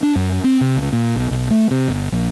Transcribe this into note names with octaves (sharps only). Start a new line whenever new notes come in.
D4
F#2
C4
C3
C#2
A#2
B1
B1
A3
C3
G1
A#1